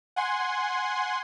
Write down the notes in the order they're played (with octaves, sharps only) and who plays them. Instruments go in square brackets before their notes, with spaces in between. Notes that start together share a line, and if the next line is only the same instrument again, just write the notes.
[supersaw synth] F#5 G#5 C6